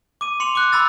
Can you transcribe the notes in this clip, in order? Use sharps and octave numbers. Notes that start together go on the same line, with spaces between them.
D6 D#7
C6 C#7 F7
D6 F#6
B5 E6 A6